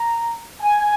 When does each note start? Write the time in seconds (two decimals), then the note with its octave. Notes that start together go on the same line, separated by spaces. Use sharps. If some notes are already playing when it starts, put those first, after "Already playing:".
Already playing: A#5
0.61 G#5